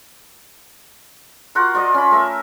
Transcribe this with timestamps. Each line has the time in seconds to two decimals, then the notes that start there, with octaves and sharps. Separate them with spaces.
1.55 F4 F#4 A#4 F#5
1.75 F4 D5 D#5
1.94 C#4 B5
2.11 A3 A#4 E5